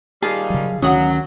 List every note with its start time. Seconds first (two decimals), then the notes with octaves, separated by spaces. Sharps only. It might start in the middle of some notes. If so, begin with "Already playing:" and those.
0.22 A#2 D#3 G3 G#4 F5 A5
0.50 C#3 F#3
0.82 D2 D#3 F#3 C#4 F#4 F#5 D#6